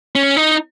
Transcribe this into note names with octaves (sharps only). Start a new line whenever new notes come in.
C#4
D#4